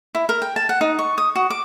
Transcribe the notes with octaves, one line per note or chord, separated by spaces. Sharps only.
E4
A#4
G5
A5
F#5
D#4
C#6
D#6
F#4
D6